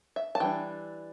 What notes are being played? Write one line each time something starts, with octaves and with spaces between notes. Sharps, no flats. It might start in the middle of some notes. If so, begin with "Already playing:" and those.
E5
A5
E3 G3 D4 G5